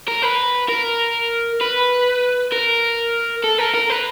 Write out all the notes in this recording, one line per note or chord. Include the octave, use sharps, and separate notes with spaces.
A#4
B4
A#4
B4
A#4
A4
A#4
A#4
B4